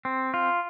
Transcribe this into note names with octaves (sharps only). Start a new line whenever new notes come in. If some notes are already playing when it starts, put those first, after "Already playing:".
C4
F4